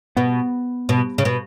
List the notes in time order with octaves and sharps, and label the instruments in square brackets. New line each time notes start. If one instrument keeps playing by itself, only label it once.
[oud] B2 [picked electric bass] B3
[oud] B2
C#3
B2